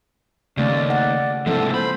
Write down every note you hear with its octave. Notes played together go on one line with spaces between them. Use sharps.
D#2 C#3 A3 C#4 D5
F#5
G#2 C3 F3 A#3 E4 A4
C5 B5